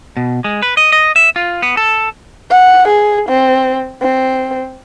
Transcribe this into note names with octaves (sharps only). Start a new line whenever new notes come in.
B2
G#3
B4
D#5
D#5
E5
F4
B3
A4
F#5
G#4
C4
C4